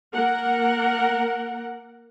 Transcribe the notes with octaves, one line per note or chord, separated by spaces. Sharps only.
A#3 A#4 F#5